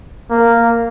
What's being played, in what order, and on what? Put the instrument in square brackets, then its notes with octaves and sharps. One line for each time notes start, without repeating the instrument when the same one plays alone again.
[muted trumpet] A#3